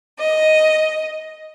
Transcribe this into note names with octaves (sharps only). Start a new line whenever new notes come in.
D#5